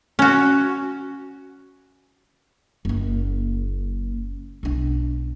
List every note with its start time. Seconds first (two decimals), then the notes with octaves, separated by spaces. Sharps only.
0.19 C#4 F#4
2.85 F#1 A#3
4.63 B1 D4